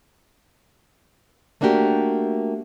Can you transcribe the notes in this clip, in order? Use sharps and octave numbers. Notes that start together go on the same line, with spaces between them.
A3 A#3 D4 F#4 G4 A#4